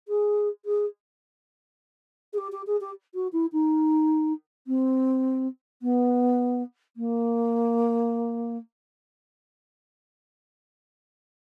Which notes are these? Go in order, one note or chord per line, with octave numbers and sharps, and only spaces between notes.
G#4
G#4
G#4
G4
G4
G#4
G4
F#4
E4
D#4
C4
B3
A#3